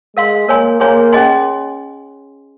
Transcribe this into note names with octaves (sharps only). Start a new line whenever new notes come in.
G#3 A#4 F5 C6
A#3 A#4 C#5 G#5 C6
A#3 G#4 C#5 G#5 C6
C#4 G#4 D#5 G#5 C6